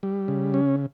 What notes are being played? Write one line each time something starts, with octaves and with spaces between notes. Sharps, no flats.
G3
C#3
C#4